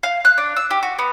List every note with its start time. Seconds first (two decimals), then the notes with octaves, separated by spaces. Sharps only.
0.03 F5
0.25 F#6
0.38 D4
0.57 E6
0.71 G4
0.83 F#4
0.99 B3